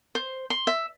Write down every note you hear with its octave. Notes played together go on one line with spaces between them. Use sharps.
C5
C6
E5